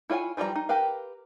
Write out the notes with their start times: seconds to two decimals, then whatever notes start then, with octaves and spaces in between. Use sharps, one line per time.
0.10 E4 F4 C#5 F#5 G#5
0.37 E3 F3 G3 G#4 A#5
0.56 D#4
0.69 G4 A#4 B4 F5